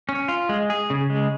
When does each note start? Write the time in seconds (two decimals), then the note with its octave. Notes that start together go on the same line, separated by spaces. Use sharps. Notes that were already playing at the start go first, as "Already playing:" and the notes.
0.09 C#4
0.28 F4
0.49 G#3
0.70 G#4
0.90 C#3
1.10 G#3